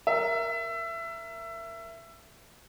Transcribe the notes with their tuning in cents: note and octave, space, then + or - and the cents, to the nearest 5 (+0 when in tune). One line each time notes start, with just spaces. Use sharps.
A#4 +0 E5 +20